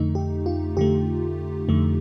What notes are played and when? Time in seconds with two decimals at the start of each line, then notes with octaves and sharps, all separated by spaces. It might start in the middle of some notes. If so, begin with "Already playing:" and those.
Already playing: F2 D3 A3 D#4
0.15 G4
0.46 F4
0.77 F2 D3 A3 G4
1.69 F2 D3 A3